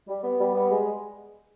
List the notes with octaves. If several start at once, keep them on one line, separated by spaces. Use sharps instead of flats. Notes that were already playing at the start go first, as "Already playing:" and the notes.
G3
B3
G3
B3
G#3